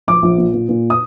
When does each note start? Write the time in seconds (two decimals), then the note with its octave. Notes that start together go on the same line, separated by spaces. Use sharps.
0.07 A#1 D6
0.22 A#1
0.38 A#2
0.54 A#2
0.69 A#2
0.90 D#6